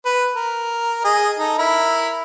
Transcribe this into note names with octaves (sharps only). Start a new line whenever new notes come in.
B4
A#4
G#4 D#5
D#4 A4
E4 A#4 B5